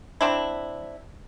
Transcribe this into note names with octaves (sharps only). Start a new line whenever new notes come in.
C4 D4 E4